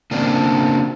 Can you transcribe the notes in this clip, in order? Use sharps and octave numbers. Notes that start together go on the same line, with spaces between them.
C#3 A#3 C4 D4